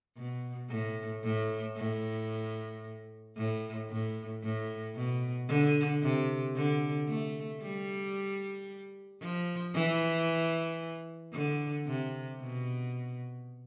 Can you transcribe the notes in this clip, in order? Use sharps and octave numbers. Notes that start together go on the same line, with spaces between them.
B2
A2
A2
A2
A2
A2
A2
B2
D3
C3
D3
A3
G3
F3
E3
D3
C3
B2